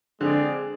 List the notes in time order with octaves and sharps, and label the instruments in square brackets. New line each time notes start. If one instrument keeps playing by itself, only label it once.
[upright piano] D3 [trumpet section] G#3 C4 G#4 D5